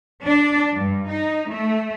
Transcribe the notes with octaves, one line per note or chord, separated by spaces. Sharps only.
D4
G2
D#4
A3